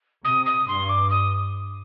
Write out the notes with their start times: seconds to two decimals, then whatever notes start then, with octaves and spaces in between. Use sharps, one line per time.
0.25 C3 D#6
0.46 D#6
0.68 G2 C6
0.89 D6
1.10 D#6